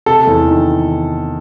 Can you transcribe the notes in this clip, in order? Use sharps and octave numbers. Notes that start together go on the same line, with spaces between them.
C3 A4
E2
D#3